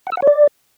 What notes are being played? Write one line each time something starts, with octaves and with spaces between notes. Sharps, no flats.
F#5
E6
F#5
C#5
D5